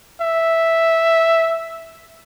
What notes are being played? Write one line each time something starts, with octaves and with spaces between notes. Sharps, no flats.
E5